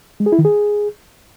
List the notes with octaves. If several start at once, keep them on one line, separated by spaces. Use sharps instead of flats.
G#3
G#4
E4
D#3
G#4